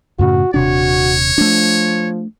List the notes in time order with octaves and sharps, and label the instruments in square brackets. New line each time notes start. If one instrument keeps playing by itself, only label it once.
[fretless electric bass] F#2 A2 C#3 [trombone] F#4
[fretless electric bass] D#1 C3 D4 [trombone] F#4 [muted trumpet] C#5
[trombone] F3 [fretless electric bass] A3 D4